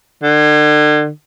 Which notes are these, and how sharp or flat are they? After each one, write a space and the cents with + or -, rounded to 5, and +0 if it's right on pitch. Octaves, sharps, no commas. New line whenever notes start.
D3 +40